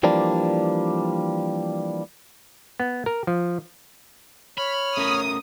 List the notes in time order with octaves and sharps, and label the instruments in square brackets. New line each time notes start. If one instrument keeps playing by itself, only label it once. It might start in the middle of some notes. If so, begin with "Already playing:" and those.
[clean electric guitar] E3 F3 G3 A#3 D4
[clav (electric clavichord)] B3
A#4
F3
[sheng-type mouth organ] C#5 F6 [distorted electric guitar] B5
[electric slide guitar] A3 C#4 A#4 [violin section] D#6